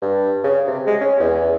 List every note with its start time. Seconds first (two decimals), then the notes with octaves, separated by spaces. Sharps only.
0.02 G2
0.44 C#3
0.67 C3
0.87 G#3
1.01 C#4
1.20 E2